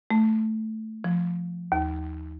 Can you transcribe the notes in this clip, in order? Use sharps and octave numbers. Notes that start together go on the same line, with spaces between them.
A3
F3
D#2